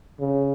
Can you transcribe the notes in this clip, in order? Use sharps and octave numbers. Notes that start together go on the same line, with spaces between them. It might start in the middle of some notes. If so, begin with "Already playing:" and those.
C#3